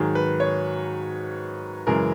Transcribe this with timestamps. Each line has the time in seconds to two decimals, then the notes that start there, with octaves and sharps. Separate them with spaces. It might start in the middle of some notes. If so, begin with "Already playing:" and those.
Already playing: G#2 D#3 F#3 G#4
0.15 B4
0.40 C#5
1.87 F#2 C#3 E3 G#3 A#4